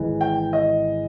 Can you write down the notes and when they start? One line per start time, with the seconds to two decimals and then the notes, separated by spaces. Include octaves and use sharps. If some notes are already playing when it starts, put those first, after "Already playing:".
Already playing: G#1 G#2 E3
0.21 G5
0.53 D#5